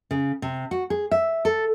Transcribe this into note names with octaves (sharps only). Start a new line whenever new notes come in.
C#3
C3
F#4
G#4
E5
A4